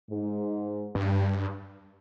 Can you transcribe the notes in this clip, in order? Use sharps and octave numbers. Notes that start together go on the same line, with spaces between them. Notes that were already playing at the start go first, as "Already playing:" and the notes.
G#2
G2